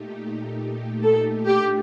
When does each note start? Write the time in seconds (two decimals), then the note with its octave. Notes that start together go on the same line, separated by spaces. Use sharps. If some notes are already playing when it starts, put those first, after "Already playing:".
Already playing: A#2 A3 D#4 G4
1.03 A4
1.47 A2 A3 D4 F4 G4